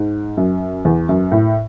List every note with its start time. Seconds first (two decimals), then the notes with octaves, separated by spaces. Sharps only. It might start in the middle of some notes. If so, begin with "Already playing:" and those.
Already playing: G#2
0.37 F#2
0.85 E2
1.09 F#2
1.32 A2